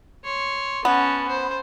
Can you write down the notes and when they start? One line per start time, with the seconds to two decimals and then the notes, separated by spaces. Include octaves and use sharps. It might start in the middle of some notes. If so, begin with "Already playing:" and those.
0.25 C#5 C6
0.85 B3 C#4 A5
1.28 C5